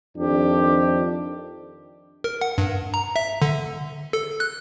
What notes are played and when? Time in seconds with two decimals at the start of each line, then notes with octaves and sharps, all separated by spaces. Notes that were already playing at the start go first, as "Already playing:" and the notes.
0.17 F2 D#3 D4 G4
2.24 A#4
2.41 F#5
2.58 G2
2.94 A#5
3.16 E5
3.42 D3
4.13 A4
4.40 F#6